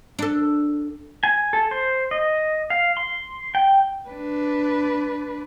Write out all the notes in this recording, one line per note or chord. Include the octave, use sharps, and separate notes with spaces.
D4 A4
G#5
A4
C5
D#5
F5
C6
G5
D4 B4